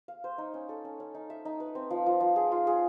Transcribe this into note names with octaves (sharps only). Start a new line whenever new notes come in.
F5
C5
D#4
C#4
A4
C#4
C#4
D#4
E5
D#4
B4
C4
F3
F3
F3
G#4
F4
G#4